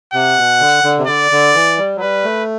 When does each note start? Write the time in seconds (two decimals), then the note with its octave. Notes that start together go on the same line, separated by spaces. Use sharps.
0.14 C3 F#5
0.37 B2
0.60 D3
0.84 D3
0.98 C3
1.07 D3 D5
1.31 D3
1.54 E3
1.78 G3
1.97 F#3
2.01 G3 B4
2.24 A3